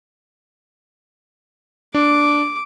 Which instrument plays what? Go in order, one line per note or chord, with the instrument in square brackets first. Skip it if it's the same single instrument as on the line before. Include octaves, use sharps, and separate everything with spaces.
[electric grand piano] D4 [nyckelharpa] D6